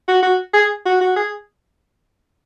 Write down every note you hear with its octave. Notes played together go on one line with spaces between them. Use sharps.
F#4
F#4
G#4
F#4
F#4
G#4